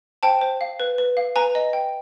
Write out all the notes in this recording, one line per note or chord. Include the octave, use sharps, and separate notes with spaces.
C5 G5 A5
C5
F5
B4
B4
F5
B4 G#5 A#5
D#5
G5